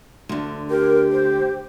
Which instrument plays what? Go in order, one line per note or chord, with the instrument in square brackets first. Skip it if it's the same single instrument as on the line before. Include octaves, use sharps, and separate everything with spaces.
[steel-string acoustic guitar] D2 D3
[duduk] G4 [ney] A#4
[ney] C5